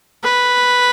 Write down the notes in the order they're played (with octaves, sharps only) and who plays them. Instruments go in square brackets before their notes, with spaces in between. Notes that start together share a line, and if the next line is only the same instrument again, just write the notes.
[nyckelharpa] B4